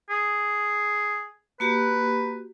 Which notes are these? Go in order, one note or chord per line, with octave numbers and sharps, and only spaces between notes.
G#4
A#3 F#4 G4 B4